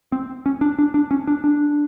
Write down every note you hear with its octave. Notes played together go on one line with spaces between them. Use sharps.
C4
C#4
D4
D4
D4
C#4
D4
D4